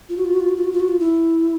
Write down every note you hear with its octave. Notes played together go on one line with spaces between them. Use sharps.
F4
F#4
F4
F#4
F4
F#4
F4
F#4
F4
F#4
F4
E4